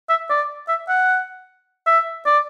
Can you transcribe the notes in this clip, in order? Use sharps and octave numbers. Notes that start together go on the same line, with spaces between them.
E5
D5
E5
F#5
E5
D5